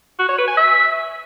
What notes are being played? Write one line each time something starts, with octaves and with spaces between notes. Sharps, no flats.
F#4
C#5
B4
G#5
E5